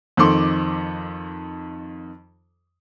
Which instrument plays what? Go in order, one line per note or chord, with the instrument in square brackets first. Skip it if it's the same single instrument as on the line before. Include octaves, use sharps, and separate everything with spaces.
[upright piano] F2 D#3 A4 C6 D6